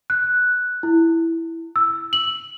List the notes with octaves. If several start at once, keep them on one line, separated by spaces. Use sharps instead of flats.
F#6
E4
E6
F#7